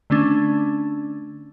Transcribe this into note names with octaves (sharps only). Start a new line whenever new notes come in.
D3 A3 C#4 D4